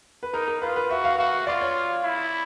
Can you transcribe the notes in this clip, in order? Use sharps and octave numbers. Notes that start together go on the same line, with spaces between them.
B4
D#4 A#4
A#4
F4 B4
B4
F#4 E5
F5
F#4 F5
F4 D5
C#5
E4